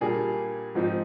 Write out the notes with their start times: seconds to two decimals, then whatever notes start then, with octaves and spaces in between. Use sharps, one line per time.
0.01 A#2 G3 A#3 D4 G#4
0.75 G#2 F3 C4 D#4